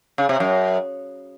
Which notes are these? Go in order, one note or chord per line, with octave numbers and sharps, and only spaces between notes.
C#3
C3
F#2